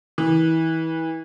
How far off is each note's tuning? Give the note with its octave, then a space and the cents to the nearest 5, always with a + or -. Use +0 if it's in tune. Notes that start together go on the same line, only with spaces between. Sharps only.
E3 -25